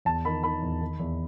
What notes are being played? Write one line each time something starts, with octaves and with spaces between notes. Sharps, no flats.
E2 A5
D#3 B5
D#3 B5
E2
D#3
E2